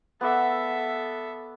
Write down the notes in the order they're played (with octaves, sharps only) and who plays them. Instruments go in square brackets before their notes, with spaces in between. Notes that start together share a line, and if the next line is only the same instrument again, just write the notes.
[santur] B3 D5 F#5 [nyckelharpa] A4 E5